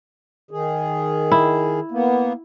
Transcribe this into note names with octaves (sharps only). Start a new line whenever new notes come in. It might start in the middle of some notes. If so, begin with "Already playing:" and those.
D#3 G#4
E4
A#3 B3